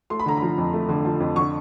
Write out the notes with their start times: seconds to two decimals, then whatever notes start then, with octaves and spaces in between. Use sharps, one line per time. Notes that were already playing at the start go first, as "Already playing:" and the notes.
0.10 A3 C6
0.20 B5
0.26 D3 A#5
0.37 B5
0.42 F3
0.58 F2
0.73 A3
0.89 D3
1.05 F3
1.20 F2
1.36 D3 C#6